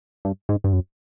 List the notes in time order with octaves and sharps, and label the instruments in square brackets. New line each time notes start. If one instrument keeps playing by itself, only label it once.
[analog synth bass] G2
G#2
G2
F#2